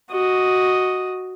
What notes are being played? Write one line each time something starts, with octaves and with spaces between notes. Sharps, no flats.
F#4 D#5